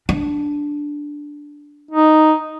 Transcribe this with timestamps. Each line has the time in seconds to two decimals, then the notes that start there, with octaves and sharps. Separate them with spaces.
0.09 D4
1.91 D#4